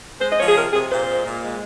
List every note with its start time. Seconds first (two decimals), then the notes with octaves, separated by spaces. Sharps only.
0.20 G#3 C5
0.31 D#5
0.38 F3 C#5
0.48 G#4
0.56 C3 A#4
0.73 C3 G#4
0.90 A#2 C5
1.08 G#3
1.25 A#2
1.41 G#3